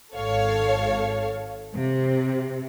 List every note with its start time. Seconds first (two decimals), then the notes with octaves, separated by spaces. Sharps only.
0.15 G#1 A4 C#5 F5
1.75 C3